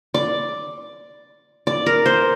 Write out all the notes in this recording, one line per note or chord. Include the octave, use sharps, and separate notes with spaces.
D5
D5
A#4
C5